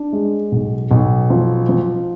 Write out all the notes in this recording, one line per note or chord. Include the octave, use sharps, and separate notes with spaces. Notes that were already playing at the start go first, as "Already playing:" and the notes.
Already playing: D4
G#3
B1
B1
F3
F3